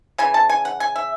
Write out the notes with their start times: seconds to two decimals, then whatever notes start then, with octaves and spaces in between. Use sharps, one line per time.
0.18 C#3 E3 G#5
0.34 A5
0.49 G#5
0.65 F#5
0.80 G#5
0.96 E5